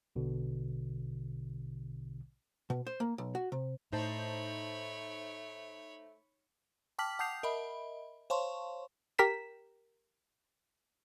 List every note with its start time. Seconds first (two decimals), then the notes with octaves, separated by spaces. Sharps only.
0.16 A#1 B2 D3
2.70 B2
2.87 C5
3.00 A#3
3.18 B1
3.35 F#4
3.52 C3
3.92 A2 A3 D#4 C5 C#5 A5 B5
6.99 G5 A5 D6 F6 B6 F#7
7.19 F#5 A5 D#6 G6 C7 F7
7.43 A#4 D#5 E5 B5
8.30 C5 C#5 F5 A5 C6 C#6
9.19 G4 A#4 B6 E7